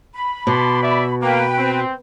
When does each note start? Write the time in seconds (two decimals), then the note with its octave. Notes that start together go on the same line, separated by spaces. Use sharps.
0.13 B5
0.47 B2 A5 C6 D6
0.82 D5 E5
1.21 A#3 B4 G5
1.57 C4